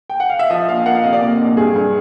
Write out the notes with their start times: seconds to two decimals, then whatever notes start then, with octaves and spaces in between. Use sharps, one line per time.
0.10 G5
0.20 F#5
0.30 F5
0.39 E5
0.50 F3 D#5
0.68 A#1 F5
0.85 A#3 F#5
0.95 F5
1.04 C3 D#5
1.13 D5
1.22 A#2
1.40 A#1
1.57 G2 G#4
1.76 G2